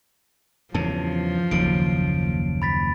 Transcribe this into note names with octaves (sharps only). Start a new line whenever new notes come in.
E2 G2 C#3 F3 A5
F#1 D#2 C#3 D7
B5 A6 B6